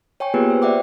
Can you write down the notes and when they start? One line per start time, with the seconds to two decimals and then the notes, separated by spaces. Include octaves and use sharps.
0.20 C#5 G5 G#5 C#6
0.34 A#3 B3 F4 G4 G#4 B4
0.50 C5
0.62 D5 E5 F#5 G5 D6